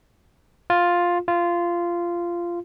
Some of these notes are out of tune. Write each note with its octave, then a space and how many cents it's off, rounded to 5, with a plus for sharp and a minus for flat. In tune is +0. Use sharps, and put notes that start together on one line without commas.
F4 +5
F4 -15